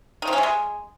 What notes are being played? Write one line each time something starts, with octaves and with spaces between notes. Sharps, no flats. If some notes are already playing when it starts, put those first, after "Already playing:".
D#3
F3
C#4
C3
G#3